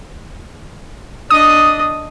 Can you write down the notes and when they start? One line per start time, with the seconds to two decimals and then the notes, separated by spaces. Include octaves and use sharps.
1.31 D4 D#5 D#6